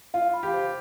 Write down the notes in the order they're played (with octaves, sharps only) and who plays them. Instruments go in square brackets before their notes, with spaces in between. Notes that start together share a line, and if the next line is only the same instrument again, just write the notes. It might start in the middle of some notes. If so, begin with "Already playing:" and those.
[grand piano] F4 [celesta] F5
[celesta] B5
[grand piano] G4
[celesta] C5